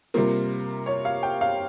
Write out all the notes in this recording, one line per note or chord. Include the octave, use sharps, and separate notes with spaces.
C3 G3 A#3 F4 A#4
C#5
F5
G5
F5